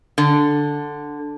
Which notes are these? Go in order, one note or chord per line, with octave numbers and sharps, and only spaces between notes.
D3